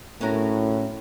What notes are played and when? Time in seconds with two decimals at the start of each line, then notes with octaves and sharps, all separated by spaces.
0.21 A2 C#4 F#4 A#4